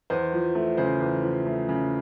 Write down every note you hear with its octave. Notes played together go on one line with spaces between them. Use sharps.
E2 C5
F3
A3
C#3 C5
E2
F3
A3
C#3